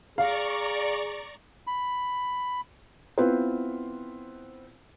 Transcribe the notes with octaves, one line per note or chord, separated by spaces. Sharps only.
G#4 D5 F5 A#5 C#6
B5
B3 C4 E4 F4 B4 C5